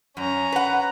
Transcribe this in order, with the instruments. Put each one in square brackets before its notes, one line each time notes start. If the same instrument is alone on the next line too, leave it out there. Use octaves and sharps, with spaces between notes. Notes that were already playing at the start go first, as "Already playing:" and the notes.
[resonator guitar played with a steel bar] F#2 [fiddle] C#4 A#5
[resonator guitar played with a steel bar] B4 F#5